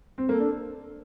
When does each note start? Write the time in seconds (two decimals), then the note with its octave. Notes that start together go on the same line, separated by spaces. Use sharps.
0.18 C4
0.29 A#3 A4
0.40 D4